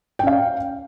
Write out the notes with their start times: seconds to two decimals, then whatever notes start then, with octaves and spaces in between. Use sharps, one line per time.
0.19 G5
0.23 C#4
0.27 F5